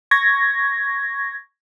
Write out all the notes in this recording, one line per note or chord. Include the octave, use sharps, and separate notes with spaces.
C#6 G#6 A#6